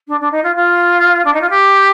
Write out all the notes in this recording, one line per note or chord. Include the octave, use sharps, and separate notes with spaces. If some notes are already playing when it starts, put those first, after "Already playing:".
D4
D4
D#4
F4
F4
D4
D#4
F4
G4